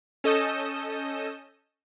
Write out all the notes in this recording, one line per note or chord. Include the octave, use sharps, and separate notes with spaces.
C#4 A4 D#5 D#6 G6 E7